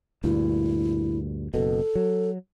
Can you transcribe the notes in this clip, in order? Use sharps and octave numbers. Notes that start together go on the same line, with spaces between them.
D2 G2 A#2 E4
F#1 B2 A4
F#3